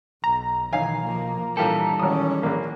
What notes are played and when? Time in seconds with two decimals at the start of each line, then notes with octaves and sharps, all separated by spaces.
0.24 B1 A#5
0.73 B1 D#3 E3 D#4 F5 G#5
1.05 F3 A#3
1.57 A#2 E3 G3 D4 F4 A4 A#4 G5
1.99 G#1 D#3 C#4 D#6
2.43 A#1 A#3